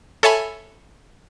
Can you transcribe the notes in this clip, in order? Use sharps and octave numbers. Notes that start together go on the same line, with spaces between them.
A4 C#5 E5 G#5 A5 B5